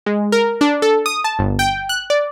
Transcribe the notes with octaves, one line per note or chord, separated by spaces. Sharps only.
G#3
A#4
D4
A4
D#6
A5
G1
G5
F#6
D5